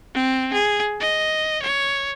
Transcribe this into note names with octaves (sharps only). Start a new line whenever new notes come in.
C4
G#4
D#5
C#5